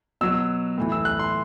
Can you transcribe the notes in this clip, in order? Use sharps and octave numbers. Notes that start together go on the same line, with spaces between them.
B2 F#3 E6
A2 E3
E6
F#6
C6